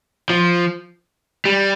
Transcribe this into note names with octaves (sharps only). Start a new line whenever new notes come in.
F3
G3